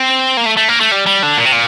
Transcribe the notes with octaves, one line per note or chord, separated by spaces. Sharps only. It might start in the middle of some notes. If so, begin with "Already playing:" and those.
Already playing: C4
A#3
A3
A3
A#3
A3
G3
G3
D3
A#2
C3
A#2